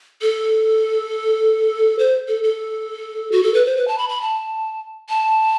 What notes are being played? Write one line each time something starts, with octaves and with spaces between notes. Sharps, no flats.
A4
C5
A4
A4
F#4
A4
B4
C5
B4
A5
B5
B5
A5
A5